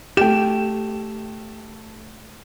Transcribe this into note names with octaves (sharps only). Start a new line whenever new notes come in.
A3 G4 G5 E7